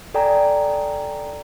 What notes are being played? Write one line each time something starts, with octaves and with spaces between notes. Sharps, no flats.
A4 D5 G5 G#5 A#5